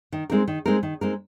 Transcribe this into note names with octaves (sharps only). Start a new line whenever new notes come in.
D#3
G#3 C4 D#4 A#4
D#3
G#3 C4 D#4 A#4
D#3
G#3 C4 D#4 A#4